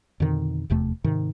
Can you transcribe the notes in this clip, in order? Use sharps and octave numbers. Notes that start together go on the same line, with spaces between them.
F2 B2 D3 D#3
F1 E2 C3 A3
G#2 C3 D#3